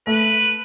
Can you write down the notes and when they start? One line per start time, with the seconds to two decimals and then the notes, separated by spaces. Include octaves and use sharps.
0.07 A3 B4